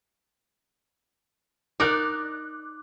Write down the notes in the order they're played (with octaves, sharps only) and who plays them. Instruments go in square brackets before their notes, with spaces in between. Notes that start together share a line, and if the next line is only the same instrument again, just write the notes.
[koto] D#4 A#4 D5 [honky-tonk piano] D6 F#6